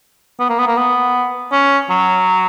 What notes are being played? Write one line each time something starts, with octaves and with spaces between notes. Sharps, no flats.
B3
A#3
B3
A#3
B3
C#4
F#3